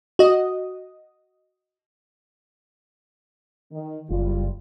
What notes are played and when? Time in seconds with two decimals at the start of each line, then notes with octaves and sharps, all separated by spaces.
0.19 F#4 D#5
3.72 D#3
4.10 F#1 G3 F4